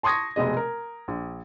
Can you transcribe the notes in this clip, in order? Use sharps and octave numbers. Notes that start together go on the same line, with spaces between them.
A5 C6 C#6 D#6 G#6 A#6
F1 B2 G#3 D#5
A#4
A#1